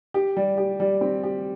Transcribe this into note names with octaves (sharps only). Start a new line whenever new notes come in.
G4
G3
G4
G3
C4
G4